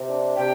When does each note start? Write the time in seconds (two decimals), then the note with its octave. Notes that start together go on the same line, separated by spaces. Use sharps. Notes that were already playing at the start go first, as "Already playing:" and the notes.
Already playing: C3
0.08 D4
0.37 C3 G5